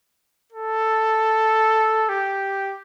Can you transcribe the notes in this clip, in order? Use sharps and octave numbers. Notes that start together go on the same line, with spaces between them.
A4
G4